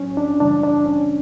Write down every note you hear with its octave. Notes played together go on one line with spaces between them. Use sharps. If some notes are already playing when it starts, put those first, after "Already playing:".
Already playing: A2 F#3 C#4
D4
F#2 C#3 E3 G3 D4
D4
C#4